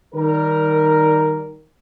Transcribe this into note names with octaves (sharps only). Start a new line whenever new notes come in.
D#3 G3 A#4